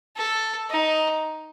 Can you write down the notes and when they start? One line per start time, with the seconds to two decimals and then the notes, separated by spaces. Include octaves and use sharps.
0.17 A4
0.70 D#4